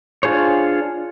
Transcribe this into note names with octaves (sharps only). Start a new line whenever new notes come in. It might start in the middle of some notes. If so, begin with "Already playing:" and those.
D4 F4 G#4 C5 C#5